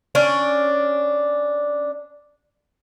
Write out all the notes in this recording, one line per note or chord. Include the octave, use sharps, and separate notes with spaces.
C#4 D4 D5